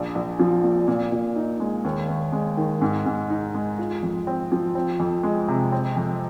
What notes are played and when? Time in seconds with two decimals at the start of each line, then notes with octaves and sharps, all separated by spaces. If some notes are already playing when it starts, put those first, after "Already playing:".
Already playing: A#1
0.15 A#1
0.40 F3
0.63 A#2
0.88 A#2
1.12 A#2
1.36 D#4
1.60 G#3
1.85 D#2
2.09 D#2
2.32 G#3
2.57 D#3
2.81 G#2
3.06 G#2
3.30 D#4
3.55 G#3
3.78 F4
4.03 F2
4.27 C4
4.52 F3
4.75 C4
5.00 F2
5.23 G#3
5.48 C3
5.72 C4
5.96 F2